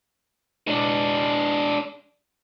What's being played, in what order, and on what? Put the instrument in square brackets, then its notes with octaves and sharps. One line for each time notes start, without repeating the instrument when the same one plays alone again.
[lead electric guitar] G#3 D4